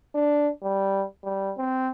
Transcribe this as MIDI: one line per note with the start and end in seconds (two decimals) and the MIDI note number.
0.15 0.49 62
0.63 1.05 55
1.24 1.52 55
1.57 1.90 60